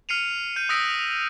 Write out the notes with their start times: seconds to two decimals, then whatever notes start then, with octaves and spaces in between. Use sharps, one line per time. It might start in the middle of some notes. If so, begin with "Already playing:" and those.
0.09 F6 C7 C#7 D#7 F7
0.56 G6 D#7
0.69 D#6 E6 F#6 A#6 B6 D7